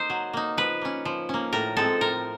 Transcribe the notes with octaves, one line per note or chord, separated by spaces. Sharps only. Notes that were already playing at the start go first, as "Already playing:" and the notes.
Already playing: A#3 D#4 C5
F#3
A#3 D#4
F3 B4
A#3 C#4
F3
A#3 C#4
A2 A#4
F3 G#3 C4 A4
A2 A#4